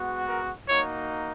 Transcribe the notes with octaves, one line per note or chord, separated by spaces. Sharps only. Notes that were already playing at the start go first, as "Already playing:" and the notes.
Already playing: G#3 B3 F#4
A#4
A#3 D#4 F#4 C#5